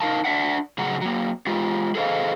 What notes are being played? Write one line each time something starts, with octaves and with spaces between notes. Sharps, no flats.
D#4 A#4 F5 A5
D4 E5 F#5
A2 C#3 F#3 G#4 F#5 A#5
F#3 A#3
G#3 F4 G4
G#4 A4 C5 D#5 F5